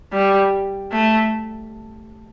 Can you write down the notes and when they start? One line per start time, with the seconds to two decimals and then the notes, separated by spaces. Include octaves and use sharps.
0.13 G3
0.92 A3